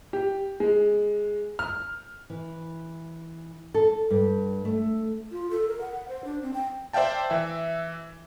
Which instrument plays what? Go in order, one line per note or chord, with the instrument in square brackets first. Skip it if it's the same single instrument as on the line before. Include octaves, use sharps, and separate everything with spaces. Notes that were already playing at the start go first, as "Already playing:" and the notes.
[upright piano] G4
G#3
F6
[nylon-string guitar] E3
A4
G2
A3
[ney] F4
A4
A#4
F#5
C5
D4
C4
G5
[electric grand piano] C5 D5 E5 F5 G5 A5
E3 E5